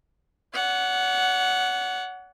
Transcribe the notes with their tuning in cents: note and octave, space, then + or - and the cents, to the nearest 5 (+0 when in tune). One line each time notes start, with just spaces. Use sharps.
C#5 +45 F#5 +0